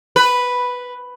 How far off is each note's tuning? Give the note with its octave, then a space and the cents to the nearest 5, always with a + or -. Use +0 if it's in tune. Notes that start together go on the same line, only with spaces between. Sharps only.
B4 +0